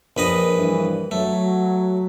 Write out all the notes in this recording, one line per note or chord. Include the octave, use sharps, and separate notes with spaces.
A#1 B4 D#5
G2 E3
F#3 A3